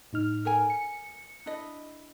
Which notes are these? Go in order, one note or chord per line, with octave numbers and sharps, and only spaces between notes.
A2 D#4 F6
A4 A#4 G#5
C#7
D4 E4 D#5